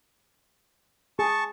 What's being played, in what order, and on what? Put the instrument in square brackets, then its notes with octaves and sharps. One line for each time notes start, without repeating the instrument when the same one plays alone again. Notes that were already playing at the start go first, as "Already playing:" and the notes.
[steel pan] G#4 [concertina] A5 C#6